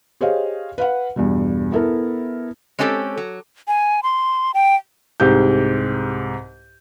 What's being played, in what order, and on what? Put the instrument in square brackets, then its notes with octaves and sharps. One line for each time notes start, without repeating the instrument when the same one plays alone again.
[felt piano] G4 G#4 C5 C#5 D#5 F5
B4 F5 F#5
E2 G2 B2
B3 E4 A4 A#4
[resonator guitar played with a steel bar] G#3 C4 C#4 G4 A4
F#3
[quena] G#5
C6
G5
[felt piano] C2 G#2 G4 G6